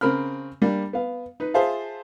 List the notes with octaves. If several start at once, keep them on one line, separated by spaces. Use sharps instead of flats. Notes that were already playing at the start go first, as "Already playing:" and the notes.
C#3 C4 A#4 B5 F6
G3 A#3 D4
B3 F5
D#4 B4
F4 G#4 C5 E5 F5 A5